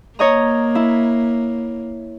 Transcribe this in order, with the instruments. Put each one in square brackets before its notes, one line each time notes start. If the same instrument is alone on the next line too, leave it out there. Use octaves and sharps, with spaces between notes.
[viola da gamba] A#3 [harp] C#5 D#5 A#5
[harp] E4